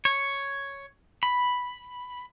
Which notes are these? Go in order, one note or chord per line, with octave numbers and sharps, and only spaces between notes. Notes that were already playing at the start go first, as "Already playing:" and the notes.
C#5
B5